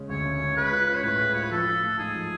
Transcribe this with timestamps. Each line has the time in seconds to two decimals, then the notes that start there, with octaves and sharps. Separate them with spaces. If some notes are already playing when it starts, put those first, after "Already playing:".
Already playing: C#3 G#3 C#4
0.09 D2 C#5
0.26 C#3
0.40 C#4
0.56 G#3 B4
0.72 F4
0.88 C#4
0.96 C#5
1.03 A2 B4
1.20 G#3
1.34 F4 C#5
1.43 B4
1.51 F3 A4
1.67 F4
1.83 A3
1.99 G#2 G#4
2.15 F3